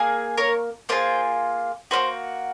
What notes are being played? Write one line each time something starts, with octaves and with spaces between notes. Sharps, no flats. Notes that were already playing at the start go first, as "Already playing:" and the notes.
Already playing: A#3 G#4
A#4 C#5
A#3 F4 G#4 C5
A#3 C#4 F#4 C5